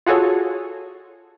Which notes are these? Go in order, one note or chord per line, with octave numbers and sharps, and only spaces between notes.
F4 F#4 G#4 A4 C#5